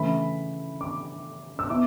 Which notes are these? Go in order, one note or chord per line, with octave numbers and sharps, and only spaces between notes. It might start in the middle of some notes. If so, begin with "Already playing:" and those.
Already playing: C#3 E3 A3 E4 B5
D6
E6
B3 E4 D6